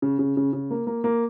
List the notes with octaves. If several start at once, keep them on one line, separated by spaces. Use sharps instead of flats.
C#3
C#3
C#3
C#3
A#3
A#3
A#3